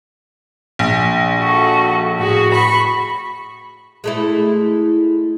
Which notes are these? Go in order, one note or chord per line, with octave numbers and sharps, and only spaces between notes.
A#1
F#4 A4
A2 F#4 G#4
B5 C#6
G#3 A3 E4